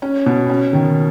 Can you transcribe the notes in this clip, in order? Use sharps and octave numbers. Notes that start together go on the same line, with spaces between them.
C#4
B2
C#4
D#3